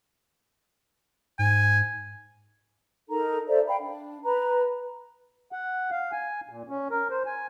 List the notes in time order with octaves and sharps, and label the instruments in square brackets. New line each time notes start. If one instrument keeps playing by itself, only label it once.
[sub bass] G#2 [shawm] G#5
[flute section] D#4 A4 A#4 A#5
A4 C5 D5 E5
F5 G5 B5
D4
B4 A#5 B5
[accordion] F#5
F5
G#5
A#2
C#4
A#4
C5
G#5